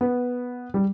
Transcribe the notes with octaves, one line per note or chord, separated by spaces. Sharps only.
B3
G3